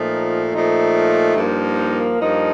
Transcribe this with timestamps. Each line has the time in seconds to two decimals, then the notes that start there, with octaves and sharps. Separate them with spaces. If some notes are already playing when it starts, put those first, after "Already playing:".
Already playing: A#2 F3 A3 D#4
0.51 A#2 F3 A3 D#4
1.35 G2 F3 A#3 D#4
2.19 G2 F3 A#3 D#4